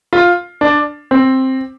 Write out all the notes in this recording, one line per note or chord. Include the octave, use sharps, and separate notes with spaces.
F4
D4
C4